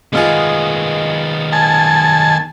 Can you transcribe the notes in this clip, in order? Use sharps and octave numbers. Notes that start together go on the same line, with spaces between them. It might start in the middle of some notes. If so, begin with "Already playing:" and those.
D#3 G#3 B3 F4 G#4
G#5 A5